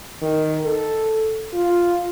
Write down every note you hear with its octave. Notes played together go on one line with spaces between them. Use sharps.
D#3
A4
F4